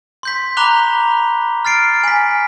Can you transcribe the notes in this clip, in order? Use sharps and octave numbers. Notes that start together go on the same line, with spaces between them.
C6 G6 B6
A#5 B5 D6 F#6 F7 G7
F6 A6 C7 D7
G#5 B6